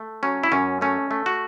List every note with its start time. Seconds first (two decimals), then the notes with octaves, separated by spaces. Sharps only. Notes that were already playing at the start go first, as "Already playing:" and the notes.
Already playing: A3
0.23 F#3 C#4
0.44 E4
0.52 F#2 C#4
0.81 A3 C#4
1.11 A3
1.26 F#4